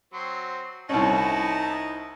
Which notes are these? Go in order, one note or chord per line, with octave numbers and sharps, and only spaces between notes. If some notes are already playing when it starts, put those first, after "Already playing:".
F#3 C4 C6
C2 C#4 D#4 E4 F#4 A5